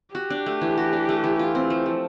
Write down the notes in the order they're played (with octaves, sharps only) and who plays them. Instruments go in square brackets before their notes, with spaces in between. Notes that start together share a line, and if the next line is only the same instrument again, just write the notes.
[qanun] F#4 [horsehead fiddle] G4
[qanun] D4
A3
E3
F#4
D4
A3
E3
F4
C4
A3
F3